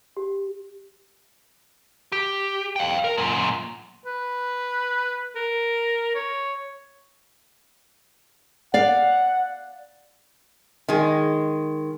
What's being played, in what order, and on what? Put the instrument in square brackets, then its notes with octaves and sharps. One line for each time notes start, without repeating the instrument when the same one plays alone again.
[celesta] G4
[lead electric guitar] G4
F5 G5
A#4
F#2 A#2
[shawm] B4
A#4
C#5
[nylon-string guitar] D5 F5 [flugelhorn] F#5
[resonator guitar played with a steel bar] D#3 G#3